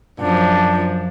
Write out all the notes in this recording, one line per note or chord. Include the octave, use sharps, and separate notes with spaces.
F#2 F3 D4